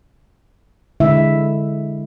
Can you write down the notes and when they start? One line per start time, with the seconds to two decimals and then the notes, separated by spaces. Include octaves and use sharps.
1.00 D3 G#3 E4 E5